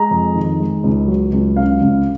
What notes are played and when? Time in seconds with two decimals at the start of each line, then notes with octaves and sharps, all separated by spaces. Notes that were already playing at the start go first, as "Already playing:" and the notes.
Already playing: G#3 A#5
0.11 F2
0.35 D#3
0.60 G#3
0.84 C#2
1.08 F#3
1.33 C#2
1.56 C#3 F5
1.81 C#2